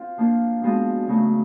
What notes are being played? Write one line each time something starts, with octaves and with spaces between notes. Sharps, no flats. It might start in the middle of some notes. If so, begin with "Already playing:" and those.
Already playing: C4 F4
F3 A#3 D4
F3 G#3 B3 D4 F#4
C#3 F#3 A3